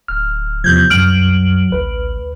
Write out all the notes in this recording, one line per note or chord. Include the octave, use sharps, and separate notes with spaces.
D1 F6
E2 C3 F3 G6 G#6
C2 F#2 F#3 F6 D7 F#7
A1 D2 B4